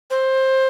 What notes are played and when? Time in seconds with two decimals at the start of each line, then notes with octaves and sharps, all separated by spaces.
0.10 C5